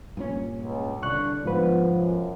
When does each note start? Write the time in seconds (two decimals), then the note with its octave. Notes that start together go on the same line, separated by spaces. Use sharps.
0.17 G2 A#2 C#4
0.62 C#2
1.03 C2 D3 D4 C#6 F#6
1.44 G#2 F3 B3 B4
1.93 F#2